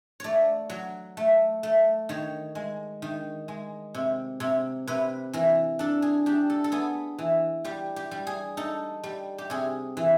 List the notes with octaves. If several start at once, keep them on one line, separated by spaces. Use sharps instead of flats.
A3 C#5 D5
F#3
A3
A3
D#3 C#5
G#3
D#3
G#3
C3
C3
C3 B4
E3 A#4
D4 A4
G#4
D4 G4
A4
A4
B3 G#4
E3
G3 G4
G4
G3
G#4
D#4 A4
G3
G4
C3 G#4
E3